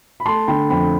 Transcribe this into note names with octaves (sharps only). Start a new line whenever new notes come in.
B5
A3 A5 C6
D3 G5 B5
F2 G5 B5